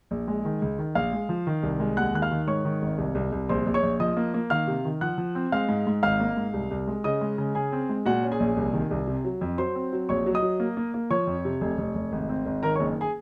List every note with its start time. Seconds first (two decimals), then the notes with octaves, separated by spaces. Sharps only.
0.11 A#1
0.28 G#3
0.45 D#3
0.62 C#2
0.79 D#3
0.95 A#1 F5 F6
1.13 G#3
1.29 F3
1.47 D#3
1.63 C2
1.80 G#3
1.97 D#2 F#5 F#6
2.14 D#3 F#6
2.22 F5 F6
2.31 D#3
2.47 G#2 C#5 C#6
2.65 D#3
2.82 G#1
2.98 C2
3.15 C2
3.32 C2
3.49 A#1 C5 C6
3.66 A#1
3.74 C#5 C#6
3.83 A#1
4.00 F3 D#5 D#6
4.17 A#3
4.34 A#3
4.50 D#3 F5 F6
4.67 C3
4.85 D#3
5.01 F3 F#5 F#6
5.18 F3
5.35 C4
5.52 G#3 F5 F6
5.69 G#2
5.87 G#2
6.03 G#1 F5 F6
6.20 A#3
6.37 G#2
6.54 C2
6.71 C2
6.87 G#3
7.04 C#3 D#5 D#6
7.21 G#3
7.38 C#3
7.55 C#3 G#4 G#5
7.72 C4
7.89 G#3
8.06 A#2 F#4 F#5
8.23 C#4
8.32 G#4 G#5
8.40 A#1
8.57 C2
8.74 D#3
8.91 C2
9.07 C3
9.24 F#3
9.41 F2
9.58 F#3 C5 C6
9.75 C4
9.93 F#3
10.09 A#1 C#5 C#6
10.26 F#3
10.34 D#5 D#6
10.42 F#3
10.60 A#3
10.77 A#3
10.94 A#3
11.10 F3 C#5 C#6
11.27 F2
11.45 C3
11.61 F1
11.78 F1
11.95 F1
12.12 G#1
12.29 C4
12.46 G#1
12.63 D#3 A#4 A#5
12.76 C#5 C#6
12.80 F#1
13.01 G#4 G#5